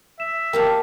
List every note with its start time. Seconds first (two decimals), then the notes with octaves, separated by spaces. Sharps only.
0.20 E5 E7
0.53 A#3 G4 F5 G5 A5